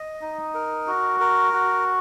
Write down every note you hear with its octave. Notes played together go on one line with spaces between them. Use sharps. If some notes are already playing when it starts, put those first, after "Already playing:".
Already playing: D#5
D#4
A#4
F#4
A#4
F#4